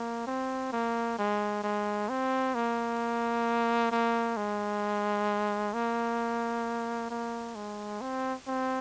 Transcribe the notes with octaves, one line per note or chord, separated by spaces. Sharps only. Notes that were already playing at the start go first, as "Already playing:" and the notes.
Already playing: A#3
C4
A#3
G#3
G#3
C4
A#3
A#3
G#3
A#3
A#3
G#3
C4
C4